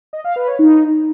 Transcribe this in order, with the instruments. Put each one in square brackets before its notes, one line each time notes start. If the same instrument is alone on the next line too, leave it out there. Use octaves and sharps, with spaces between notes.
[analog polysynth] D#5
F5
B4
C#5
D#4